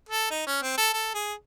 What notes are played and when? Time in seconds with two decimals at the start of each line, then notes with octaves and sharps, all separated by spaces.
0.09 A4
0.30 D#4
0.47 C#4
0.62 C4
0.77 A4
0.94 A4
1.14 G#4